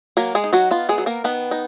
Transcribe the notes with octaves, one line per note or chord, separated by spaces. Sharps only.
F#3 A#3 A#4
G#3 G#4
D#4
F#3 F#4
B3 F4
G#3 G#4
F#3
A#3 A#4
D#3 B3 B4
D#4